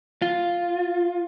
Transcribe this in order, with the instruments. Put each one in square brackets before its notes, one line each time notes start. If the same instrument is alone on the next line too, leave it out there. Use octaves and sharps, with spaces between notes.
[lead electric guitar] F4